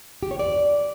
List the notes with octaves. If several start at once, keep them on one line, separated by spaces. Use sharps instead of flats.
G4
C#5
D5